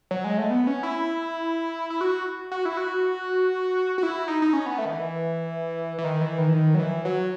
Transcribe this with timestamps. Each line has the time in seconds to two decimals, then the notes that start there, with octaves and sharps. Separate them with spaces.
0.11 F#3
0.24 G#3
0.38 A3
0.50 B3
0.67 C#4
0.83 E4
1.90 E4
2.01 F#4
2.51 F#4
2.65 E4
2.77 F#4
3.98 F#4
4.03 E4
4.28 D#4
4.42 D#4
4.53 C#4
4.66 B3
4.78 A3
4.85 D#3
4.91 E3
5.98 E3
6.04 D#3
6.21 E3
6.38 D#3
6.49 E3
6.54 D#3
6.74 F#3
6.79 E3
7.05 F#3